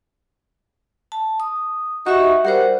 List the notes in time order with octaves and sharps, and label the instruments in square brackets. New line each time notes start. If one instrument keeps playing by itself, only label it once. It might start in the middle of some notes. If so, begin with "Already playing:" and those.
[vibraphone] A5
D#6
[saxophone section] D#4 F#4 [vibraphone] G4 E5 C#6
[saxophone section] G3 F#5 [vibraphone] G4 A#4 C5